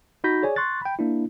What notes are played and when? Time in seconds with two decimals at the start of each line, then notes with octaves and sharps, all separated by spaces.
0.24 D#4 F#4 B5 G6 A#6 B6
0.43 G#4 C#5 D5 G#5
0.56 C6 C#6 F#6 A6
0.82 G5 B5
0.99 A#3 D4 E4